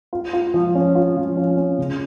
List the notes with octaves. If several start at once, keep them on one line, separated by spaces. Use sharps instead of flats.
F4
F4
F3
C#4
F4
F3
C#4
C#4
C#3